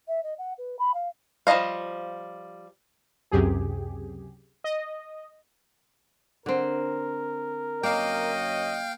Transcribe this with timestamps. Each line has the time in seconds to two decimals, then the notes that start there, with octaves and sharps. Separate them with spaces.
0.08 E5
0.23 D#5
0.38 F#5
0.58 B4
0.79 B5
0.94 F5
1.47 F3 G3 F4 D#5 F5
3.31 C#2 F#2 C3 G4 G#4
4.64 D#5
6.46 D3 C4 A#4
7.83 F#2 A#3 C#5 D#5 F5 G5